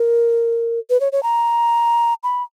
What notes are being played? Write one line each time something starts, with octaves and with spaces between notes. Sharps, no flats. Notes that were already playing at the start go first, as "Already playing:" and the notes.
Already playing: A#4
B4
C#5
C#5
A#5
B5